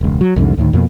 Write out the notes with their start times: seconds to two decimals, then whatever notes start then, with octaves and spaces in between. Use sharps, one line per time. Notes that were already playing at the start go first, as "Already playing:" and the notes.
0.01 E1 C#2
0.21 F#3
0.36 C2 F2 G#2 D3
0.57 D2 A2 D#3
0.73 F2 B2 A#3